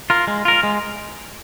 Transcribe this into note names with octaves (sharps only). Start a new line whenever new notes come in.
F4 A#4
G#3
F4 A#4
G#3